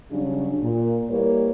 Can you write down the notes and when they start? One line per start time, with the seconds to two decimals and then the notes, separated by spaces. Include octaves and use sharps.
0.10 C#3 F#3 G3 D4
0.61 A#2
1.09 G3 A#3 E4 A#4 B4 C#5